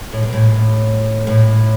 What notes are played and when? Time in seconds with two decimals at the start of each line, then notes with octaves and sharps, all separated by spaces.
0.12 A2
0.23 B2
0.33 A2
1.27 A2